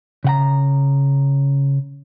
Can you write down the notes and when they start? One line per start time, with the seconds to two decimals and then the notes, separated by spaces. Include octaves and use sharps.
0.24 C#3 F#5 A#5